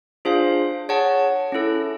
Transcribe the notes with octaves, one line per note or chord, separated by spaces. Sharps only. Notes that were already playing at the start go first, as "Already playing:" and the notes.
D4 F4 G#4 C5 F5
G#4 C#5 F#5 A5
C#4 E4 A4